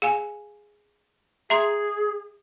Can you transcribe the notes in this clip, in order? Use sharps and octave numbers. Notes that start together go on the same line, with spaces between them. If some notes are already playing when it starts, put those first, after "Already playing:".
G#4 F5 G#5
G#4 E5 A#5 C6